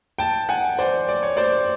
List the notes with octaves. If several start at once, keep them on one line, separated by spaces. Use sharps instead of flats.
G5 A5
F#5 G#5
C5 D5
D5
C#5
C5 D5